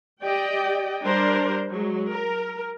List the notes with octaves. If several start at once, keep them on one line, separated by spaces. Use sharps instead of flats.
G4 D5 D#5 G5
G3 D4 A#4 C5
F#3 G#3
A#4